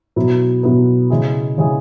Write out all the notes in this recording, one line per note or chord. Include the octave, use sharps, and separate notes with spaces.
B2 F#3 B3 E4 B4
B2 F#3 B3 E4 B4
C#3 G#3 E4 G#4
C#3 G#3 E4 G#4